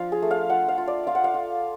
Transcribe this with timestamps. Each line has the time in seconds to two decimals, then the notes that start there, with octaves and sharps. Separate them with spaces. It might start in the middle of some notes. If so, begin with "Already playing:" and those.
Already playing: F3 D4 F4 F5
0.12 G#4
0.22 A3
0.31 F5
0.49 F4 F#5
0.68 F5
0.78 F4
0.88 D5
1.07 F4 F5
1.15 F#5
1.24 F5
1.34 F4